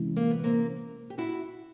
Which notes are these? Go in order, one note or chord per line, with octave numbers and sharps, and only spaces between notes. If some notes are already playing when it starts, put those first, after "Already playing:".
Already playing: C3 E3 G#3 C#4 E4
A#3
B3
A#3 C4
G4
E4 F#4